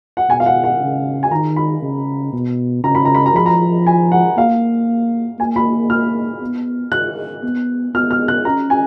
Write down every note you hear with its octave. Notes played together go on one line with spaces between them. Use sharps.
F#5
B2 G#5
F5
F#5
F#5
C#3
G#5
D#3 A#5
B5
C#3
B2
C#3 A#5
B5
A#5
B5
A#5
F3 B5
A#5
G#5
F#5
A#3 F5
A#3 G#5
B5
F6
B3
F#6
B3
B3 F6
F6
F#6
C#4 A#5
G#5